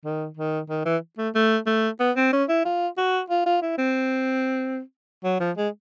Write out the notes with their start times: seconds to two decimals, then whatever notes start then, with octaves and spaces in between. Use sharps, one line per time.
0.04 D#3
0.37 D#3
0.70 D#3
0.86 E3
1.18 A3
1.35 A3
1.67 A3
2.00 B3
2.17 C4
2.33 C#4
2.49 E4
2.65 F4
2.98 F#4
3.30 F4
3.46 F4
3.62 E4
3.78 C4
5.24 F#3
5.40 F3
5.57 G#3